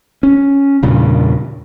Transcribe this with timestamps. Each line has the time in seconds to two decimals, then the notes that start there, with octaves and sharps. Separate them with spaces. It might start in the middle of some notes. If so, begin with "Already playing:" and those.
0.23 C#4
0.83 E2 G2 A#2 C#3